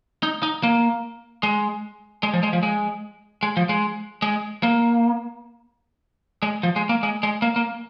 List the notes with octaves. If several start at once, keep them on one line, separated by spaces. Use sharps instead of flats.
D#4
D#4
A#3
G#3
G#3
F3
G#3
F3
G#3
G#3
F3
G#3
G#3
A#3
G#3
F3
G#3
A#3
G#3
G#3
A#3
A#3